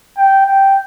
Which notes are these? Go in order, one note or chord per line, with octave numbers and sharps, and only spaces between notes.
G5
G5